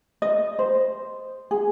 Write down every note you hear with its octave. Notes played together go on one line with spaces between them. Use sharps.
D#5
C5
G#4